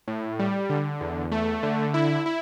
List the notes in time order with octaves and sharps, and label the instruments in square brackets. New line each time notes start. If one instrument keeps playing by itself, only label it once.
[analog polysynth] A2
G3
D3
E2
A3
D3
E4
E4